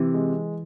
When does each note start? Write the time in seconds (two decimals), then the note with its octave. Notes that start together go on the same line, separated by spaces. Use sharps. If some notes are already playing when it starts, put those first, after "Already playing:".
Already playing: C3 E3
0.14 G#3